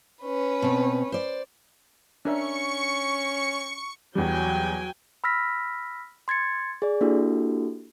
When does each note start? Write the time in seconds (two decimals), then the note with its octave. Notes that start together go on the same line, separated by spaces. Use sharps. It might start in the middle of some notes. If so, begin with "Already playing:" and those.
0.23 C#4 B4
0.62 B2 C4
1.12 C5 D5
2.25 C#4 D4 A#4 E5 C#6 C#7
4.15 E2 F#3 G3 G5 G#5
5.24 B5 E6 F6 A#6 B6
6.28 C6 G#6 A6 C#7
6.82 G#4 D5
7.01 A#3 D4 E4 F#4 G4 A4